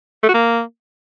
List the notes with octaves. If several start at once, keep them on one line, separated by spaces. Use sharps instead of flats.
A3
F#4
A#3